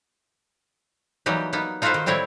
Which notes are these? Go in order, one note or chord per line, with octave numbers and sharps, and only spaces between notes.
E3 F#3 G3 A#3 D#4 G4
A#3 B3 D#4
D#4 F4 F#4 A4 B4 C5
D#3
A2 G3 C4 E4 C#5 G5